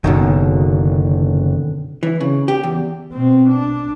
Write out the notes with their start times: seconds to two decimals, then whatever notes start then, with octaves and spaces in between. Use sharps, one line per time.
0.04 F#1 B2 D3 D#3
2.03 E3
2.20 C#3
2.48 G4
2.63 E2
3.12 B2 C4
3.50 D4